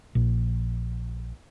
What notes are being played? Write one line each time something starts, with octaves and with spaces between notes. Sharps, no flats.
A#1